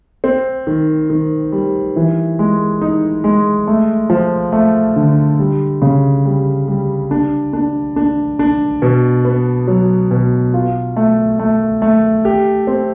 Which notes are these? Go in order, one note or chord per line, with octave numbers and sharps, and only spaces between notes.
C4
D#3
D#3
G3
E3
G#3
D#4
G#3
A3
F3
A3
D3
G3
C#3
G3
G3
D4
D4
D4
D4
B2
B3
F#3
B2
F4
A3
A3
A3
G4
C4